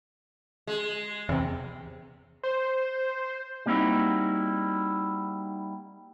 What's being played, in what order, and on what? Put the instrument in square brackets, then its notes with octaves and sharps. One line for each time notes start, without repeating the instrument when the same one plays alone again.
[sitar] G#3
[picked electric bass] E2 C3
[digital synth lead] C5
[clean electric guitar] G3 A#3 C4 D#4 E4 F#4